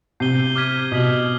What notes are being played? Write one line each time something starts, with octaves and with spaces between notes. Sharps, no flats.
C3 G6 C7 D#7 G7
D6 F6 G#6 B6 D#7
B2 D#6 G6 B6 D#7 F#7